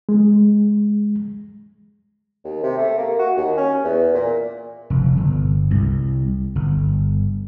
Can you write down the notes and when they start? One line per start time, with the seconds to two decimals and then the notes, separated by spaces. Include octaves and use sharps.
0.09 G#3
2.44 D#2
2.63 C3
2.78 A3
2.98 A#3
3.19 F#4
3.37 D#2
3.57 C#4
3.84 E2
4.14 A#2
4.90 F1
5.17 G1
5.71 C2
6.56 G1